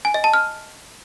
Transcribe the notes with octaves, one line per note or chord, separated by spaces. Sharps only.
G#5
D#5
A5
F6